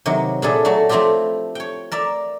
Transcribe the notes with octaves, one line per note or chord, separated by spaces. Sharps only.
C3 D#3 F#3
A#2 D4 E4 G#4 A4
F#3 A3 F#4 A4
F3 A3 C4 E4 F4 G4
C#5 G5
A#4 D5 E5